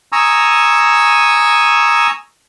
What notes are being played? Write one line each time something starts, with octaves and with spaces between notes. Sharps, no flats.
G#5 A#5 C#6 D#6 E6